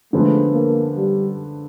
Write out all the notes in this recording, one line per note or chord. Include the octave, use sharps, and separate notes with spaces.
D3 F3 G#3 A3 B3
A#3
G3